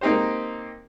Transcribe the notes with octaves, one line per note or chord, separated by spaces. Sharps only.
A#3 C4 D#4 G4 C5